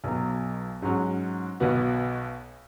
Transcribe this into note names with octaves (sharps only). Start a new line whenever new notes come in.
B1 B2 F#3
G#2 F#3 C#4 F#4
B1 B2 B3 F#4